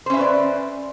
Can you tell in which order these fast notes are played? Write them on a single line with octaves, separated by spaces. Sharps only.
C5 C#4 E5 B4 D5